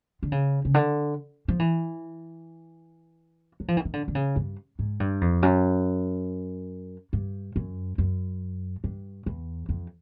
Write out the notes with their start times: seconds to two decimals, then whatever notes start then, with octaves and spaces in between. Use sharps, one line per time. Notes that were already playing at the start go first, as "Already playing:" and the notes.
0.23 D3
0.32 C#3
0.65 C#3
0.74 D3
1.48 F3
1.59 E3
3.60 F#3
3.68 F3
3.77 E3
3.85 D#3
3.93 D3
4.08 D3
4.15 C#3
4.36 G2
4.79 G#2
5.00 G2
5.21 F2
5.42 F#2
7.13 G2
7.56 F#2
7.98 F#2
8.84 G2
9.26 E2
9.69 F2